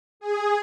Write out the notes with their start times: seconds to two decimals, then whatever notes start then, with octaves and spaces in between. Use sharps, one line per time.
0.20 G#4